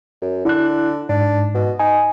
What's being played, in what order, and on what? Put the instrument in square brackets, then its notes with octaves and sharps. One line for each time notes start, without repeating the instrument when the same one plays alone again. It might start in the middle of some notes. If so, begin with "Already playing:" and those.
[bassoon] F#2
[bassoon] D3 [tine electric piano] E4 F#6
[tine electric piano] G#2 [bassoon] D4
[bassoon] B2
[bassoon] D#4 [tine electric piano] G#5